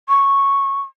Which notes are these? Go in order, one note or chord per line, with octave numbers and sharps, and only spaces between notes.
C#6